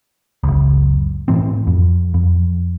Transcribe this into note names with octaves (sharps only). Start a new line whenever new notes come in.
F#1 C#2
A2 E3 C4
F2
F2